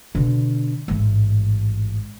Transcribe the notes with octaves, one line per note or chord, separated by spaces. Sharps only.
B2 D3
A1 G#2